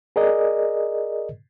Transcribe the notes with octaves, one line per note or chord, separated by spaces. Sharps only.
G#4 A#4 D5 D#5